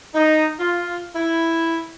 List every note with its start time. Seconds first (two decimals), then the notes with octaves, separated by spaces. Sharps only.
0.15 D#4
0.60 F4
1.16 E4